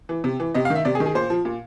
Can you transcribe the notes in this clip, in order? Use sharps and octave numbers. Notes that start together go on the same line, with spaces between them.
E3
C3
E3
C3 D#5
F5
D#3
E5
C3 D5
G#4
D#3
G#4
A#2 C5
F3
A#2